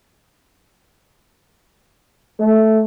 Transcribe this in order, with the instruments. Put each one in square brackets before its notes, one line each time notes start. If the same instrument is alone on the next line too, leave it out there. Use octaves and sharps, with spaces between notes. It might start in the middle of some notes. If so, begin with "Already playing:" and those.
[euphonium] A3